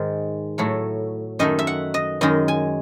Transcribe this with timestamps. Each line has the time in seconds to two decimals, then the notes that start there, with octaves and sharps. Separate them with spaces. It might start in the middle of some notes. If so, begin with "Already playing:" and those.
Already playing: G#2 D#3 G#3
0.58 A2 F#3 A3
1.39 F#2 D#3 A3 D#5
1.59 E5
1.67 F#5
1.94 D#5
2.21 F#2 D#3 G#3 D#5
2.48 G#5